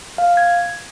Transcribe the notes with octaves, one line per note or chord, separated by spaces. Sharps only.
F5
G#6